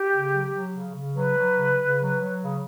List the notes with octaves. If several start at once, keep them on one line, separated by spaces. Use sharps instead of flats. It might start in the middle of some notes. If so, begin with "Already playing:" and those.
Already playing: G4
C#3
F#3
F#3
C#3
C#3
F#3 B4
F#3
C#3
C#3
F#3
F#3
C#3